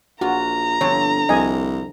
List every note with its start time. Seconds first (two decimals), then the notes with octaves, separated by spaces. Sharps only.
0.21 A#1 F4 F#4 A#5
0.81 G1 D3 F3 C4 C#5
1.29 C2 F2 D#5 G#5